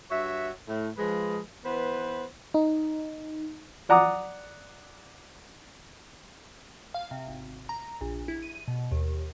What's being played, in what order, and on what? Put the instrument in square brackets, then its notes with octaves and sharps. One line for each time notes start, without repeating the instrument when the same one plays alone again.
[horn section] G2 F#4 C#5 E5
A2
F3 G#3 B4
E3 B3 B4 C5
[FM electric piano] D#4
[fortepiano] D5 F#5 A#5 D6 D#6
[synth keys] F5
C3
G#1
A#5
A#1
E4
D#7
B2
D#2